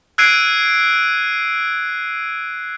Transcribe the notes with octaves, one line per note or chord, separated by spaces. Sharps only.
E6 F#6 G#6 C7 D7 D#7